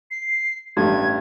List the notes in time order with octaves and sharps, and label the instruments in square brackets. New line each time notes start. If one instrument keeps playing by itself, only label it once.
[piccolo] C7
[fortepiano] A1 G2 [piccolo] G#6